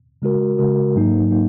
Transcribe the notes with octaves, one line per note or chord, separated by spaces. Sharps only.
C#3 G#3 F#4 A#4
C#3 G#3 F#4 A#4
G#2 F#3 A#3 D#4
F#3 A#3 D#4